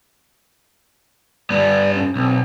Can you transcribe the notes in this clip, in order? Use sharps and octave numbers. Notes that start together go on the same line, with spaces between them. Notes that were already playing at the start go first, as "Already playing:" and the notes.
G2 B3 D5
C#4
B1 C4